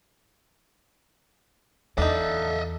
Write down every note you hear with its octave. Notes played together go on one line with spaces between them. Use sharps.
E2 D4 D#4 A4 D#5 E5